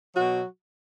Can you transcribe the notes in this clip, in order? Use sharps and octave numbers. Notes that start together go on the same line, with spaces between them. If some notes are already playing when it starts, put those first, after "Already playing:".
B2 F#3 F#4